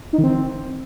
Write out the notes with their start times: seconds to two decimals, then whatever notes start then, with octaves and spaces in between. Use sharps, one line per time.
0.13 D#4
0.18 D#3
0.24 C4